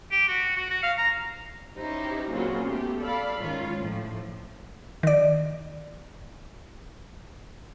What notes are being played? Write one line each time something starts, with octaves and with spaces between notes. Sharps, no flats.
G4
F#4
F#4
F#4
F5
A#5
C#4 D#4 E4 G4 C5
A#2 C#3 F#3 C4 F4 F#4
A3 B3 G4
A4 D5 F5 B5
G#2 D#3 C#4 F4
A2 F3
D#3 D5